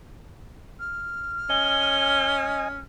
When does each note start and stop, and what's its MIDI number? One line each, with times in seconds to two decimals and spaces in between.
0.80 2.79 89
1.50 2.83 61
1.50 2.68 75
1.50 2.68 80
1.50 2.34 103